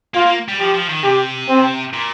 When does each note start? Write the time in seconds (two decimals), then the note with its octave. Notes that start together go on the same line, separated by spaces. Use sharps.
0.14 A#3 F4
0.26 A#3
0.48 G3
0.59 F3 G4
0.74 F3
0.89 D#3
1.03 C3 G4
1.48 C4
1.93 A#2